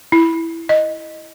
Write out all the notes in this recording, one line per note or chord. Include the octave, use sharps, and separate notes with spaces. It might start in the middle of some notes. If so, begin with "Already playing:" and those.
E4
D#5